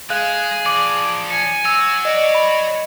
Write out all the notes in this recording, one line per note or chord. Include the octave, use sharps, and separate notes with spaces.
G#3 G#4 F5 F#6
F3 D5 D6
G#5 C#7
F#4 C#5 E6 A6
D5 D#5
B5